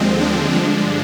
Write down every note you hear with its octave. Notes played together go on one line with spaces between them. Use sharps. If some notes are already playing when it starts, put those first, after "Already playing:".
Already playing: D#2 D3 F3 G#3 C4
D4
G2 D3 F3 G#3